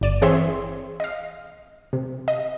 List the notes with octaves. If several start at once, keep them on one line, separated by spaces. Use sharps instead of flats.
G1 D5 D#7
E3 C4 G#4 C#5 E5 C6
D#5 F5
C3
D#5